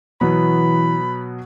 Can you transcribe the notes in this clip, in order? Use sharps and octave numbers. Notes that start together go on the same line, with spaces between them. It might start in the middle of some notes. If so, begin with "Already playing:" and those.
B2 E3 F#3 B3 B5